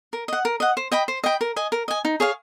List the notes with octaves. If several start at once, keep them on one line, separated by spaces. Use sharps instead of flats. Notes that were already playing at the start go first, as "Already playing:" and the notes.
A#4
D#5 F#5
A#4
D#5 F#5
C5
D#5 G5 B5
C5
D#5 G5 B5
A#4
D#5 G#5
A#4
D#5 G#5
D#4
G#4 C#5 F5